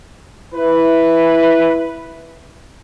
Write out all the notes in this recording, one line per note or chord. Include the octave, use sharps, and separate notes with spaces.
E4 B4